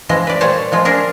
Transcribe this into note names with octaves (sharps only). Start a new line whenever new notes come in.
E3 F3 G#3 D#5
B4 D5
A#2 G3 C5 C#5 G#5 A5
F3 G#3 F4
D4 G#4 A#4 C5